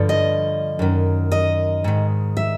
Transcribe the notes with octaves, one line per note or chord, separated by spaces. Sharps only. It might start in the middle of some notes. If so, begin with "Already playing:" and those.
Already playing: G2 D3 F3
D#5
F#2 D#3
D#5
G#2 D#3
E5